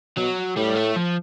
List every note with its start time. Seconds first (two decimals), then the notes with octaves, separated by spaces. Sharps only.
0.17 B2 F#3
0.57 A2 G3
0.76 A3
0.96 F3